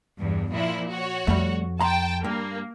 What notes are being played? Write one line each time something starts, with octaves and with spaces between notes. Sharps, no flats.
E2 G2
A#2 F3 E4
F#4 C#5
F2 G3 A3
G5 A5 A#5 C6
G2 A#3